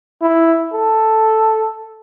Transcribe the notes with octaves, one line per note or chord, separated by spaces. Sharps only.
E4
A4